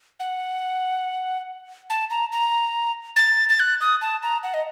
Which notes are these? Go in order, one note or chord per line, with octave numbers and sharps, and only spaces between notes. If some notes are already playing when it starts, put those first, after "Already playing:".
F#5
A5
A#5
A#5
A6
A6
F#6
D#6
A5
A#5
F#5
D#5